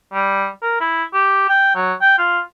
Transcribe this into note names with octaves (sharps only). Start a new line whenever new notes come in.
G3
A#4
E4
G4
G5
F#3
G5
F4